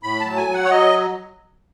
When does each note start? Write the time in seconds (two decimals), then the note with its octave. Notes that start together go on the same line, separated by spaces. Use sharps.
0.03 A2 B5
0.19 A5
0.25 F#3
0.37 G#5
0.48 F#3
0.53 F#5
0.64 C#5
0.70 F#3 D#5